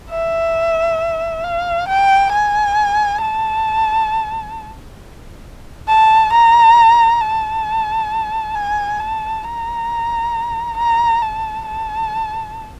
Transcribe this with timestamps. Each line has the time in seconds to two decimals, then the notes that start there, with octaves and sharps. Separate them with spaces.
0.10 E5
1.44 F5
1.88 G5
2.32 G#5
3.21 A5
5.88 A5
6.33 A#5
7.21 A5
8.55 G#5
9.00 A5
9.43 A#5
10.77 A#5
11.22 A5
11.66 A5